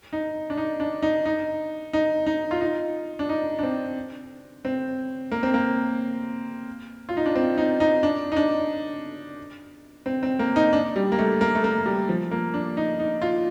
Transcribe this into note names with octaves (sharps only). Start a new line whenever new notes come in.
D#4
D4
D#4
D4
D#4
D#4
D#4
D#4
F4
D#4
D4
D#4
D4
C4
C4
A#3
C4
A#3
F4
D#4
D4
C4
D#4
D#4
D4
D#4
D4
C4
C4
A#3
D#4
D4
G3
A#3
A3
A#3
A3
A#3
G3
F3
A#3
D4
D#4
D#4
F4